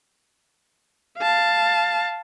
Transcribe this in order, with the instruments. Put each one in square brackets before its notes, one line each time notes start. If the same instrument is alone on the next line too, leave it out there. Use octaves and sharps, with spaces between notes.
[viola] F5 A5